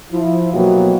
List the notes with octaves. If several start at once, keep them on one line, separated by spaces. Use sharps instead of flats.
F3 E4
B2 F#3 A#3 B3 D#4 G4